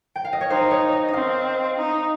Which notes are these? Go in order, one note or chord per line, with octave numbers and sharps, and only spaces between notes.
G5
F5
D#5
C#5
D#4 C5
C#5
D#5
D#5
C4 F5
D#4